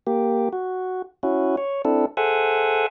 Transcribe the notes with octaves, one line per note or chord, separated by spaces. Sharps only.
A#3 G4
F#4
C#4 E4 F#4
C#5
C4 D4 E4 A4
G#4 A4 C5 E5 F#5 G#5